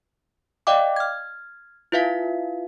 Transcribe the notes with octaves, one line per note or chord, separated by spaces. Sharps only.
D5 D#5 F5 G5 D6
F6 G#6
E4 F4 B4 E5 F5 B6